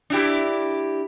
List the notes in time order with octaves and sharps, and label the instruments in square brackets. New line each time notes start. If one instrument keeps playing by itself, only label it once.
[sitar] D4 E4 G4